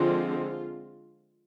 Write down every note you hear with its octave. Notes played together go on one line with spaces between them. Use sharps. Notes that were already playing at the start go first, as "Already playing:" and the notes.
Already playing: D3 F3 G#3 C4 F4